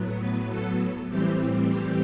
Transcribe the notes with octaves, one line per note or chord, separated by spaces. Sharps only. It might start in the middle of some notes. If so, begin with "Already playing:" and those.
Already playing: A2 F#3 B3
B4
A4
A2 E3 G3 C4 G4
G4